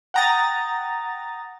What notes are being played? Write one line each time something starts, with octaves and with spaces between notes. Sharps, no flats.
F#5 G5 A#5 D#6 A6